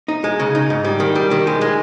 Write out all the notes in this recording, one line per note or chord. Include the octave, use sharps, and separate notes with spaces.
D#4
G#3
C#3
D#4
G#2
G3
D#3
G3
D#3
G#3
G#3